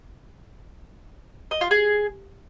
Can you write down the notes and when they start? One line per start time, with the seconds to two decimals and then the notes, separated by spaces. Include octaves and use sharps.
1.51 D#5
1.61 F4
1.71 G#4